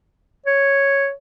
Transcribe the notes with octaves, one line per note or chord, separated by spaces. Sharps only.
C#5